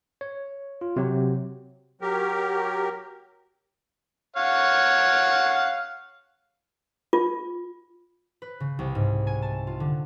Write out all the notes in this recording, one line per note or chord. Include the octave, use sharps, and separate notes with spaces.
C#5
F4
C3 F#3 G4
F#3 G4 A#4
C#5 F5 F#5
F4
B4
C#3
C2
G#2
G#5
A5
F4
D3